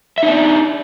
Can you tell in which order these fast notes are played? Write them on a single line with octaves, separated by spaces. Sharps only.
E5 D#4 D4